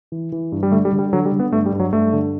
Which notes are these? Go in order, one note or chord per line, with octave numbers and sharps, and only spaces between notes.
E3
E3
G2
G3
D3 A3
G3
D3
G3
D3 F#3
G3
D3
B3
G2 A3
G3
G2
F#3
G2 A3
D3